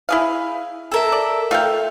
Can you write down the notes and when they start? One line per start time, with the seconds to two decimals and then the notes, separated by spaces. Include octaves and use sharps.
0.09 E4 G#4 F5
0.92 A4 A#4 E5
1.12 D5
1.51 A3 F4 F5 G5